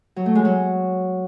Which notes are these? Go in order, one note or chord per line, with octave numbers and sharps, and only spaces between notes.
F#3
A3
G#3
F#3